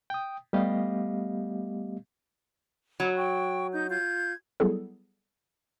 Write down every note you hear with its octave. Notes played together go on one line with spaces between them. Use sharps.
G5 D#6
G3 A3 B3 G4 D#5 F5
F#3
G5 C#6
D#4 G6
F4 G6 G#6
F#3 G3 B3 E4 G#4 A4